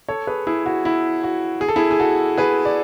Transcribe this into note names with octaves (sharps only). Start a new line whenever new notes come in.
A4 C#5
G#4 B4
E4 G#4
F#4
E4
F#4
G#4
A4
E4 G#4
G#4
F#4 A4
G#4 B4
D5